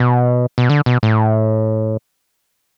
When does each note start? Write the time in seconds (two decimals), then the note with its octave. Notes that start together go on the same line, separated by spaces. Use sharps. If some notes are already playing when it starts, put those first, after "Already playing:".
Already playing: B2
0.58 B2
0.70 D3
0.86 B2
1.03 A2